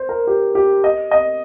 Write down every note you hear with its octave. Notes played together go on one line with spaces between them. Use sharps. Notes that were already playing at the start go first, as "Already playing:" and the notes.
Already playing: C5
A#4
G4
G4
D#5
D#5